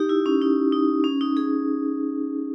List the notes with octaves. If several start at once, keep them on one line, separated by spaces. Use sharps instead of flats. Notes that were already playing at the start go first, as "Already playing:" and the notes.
Already playing: D#4 G4
E4
C#4
D#4
D#4
C#4
D#4
G#4